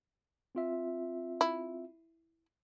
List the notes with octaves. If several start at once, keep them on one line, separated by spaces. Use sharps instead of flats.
C4 F4 E5
E4